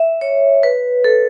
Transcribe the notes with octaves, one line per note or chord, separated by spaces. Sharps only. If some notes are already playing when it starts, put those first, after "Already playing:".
Already playing: E5
C#5
B4
A4